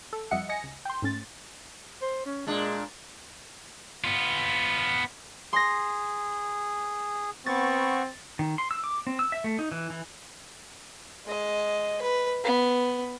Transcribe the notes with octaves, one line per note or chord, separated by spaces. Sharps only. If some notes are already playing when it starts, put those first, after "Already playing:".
A4
F2 G3 D#5 E5 F#5 C#7
D#5 G#5 A#6 C#7
C#2
G5 C6
G#2 A3 C#4 A6
C5
C#4
A#2 G#3 D4
B3 F4
G#4 C6 A#6
B3 C4 C#6 A6
D#3
C6
E6
D6
C4
E6
E5
A3
D#4
E3
E3
G#3 D#5
B4
B3